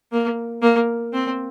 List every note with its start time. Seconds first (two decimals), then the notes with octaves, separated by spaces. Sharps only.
0.12 A#3
0.62 A#3
1.13 C4